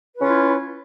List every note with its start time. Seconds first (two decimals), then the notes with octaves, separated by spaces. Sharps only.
0.15 B4
0.19 C#4
0.23 F4
0.26 E4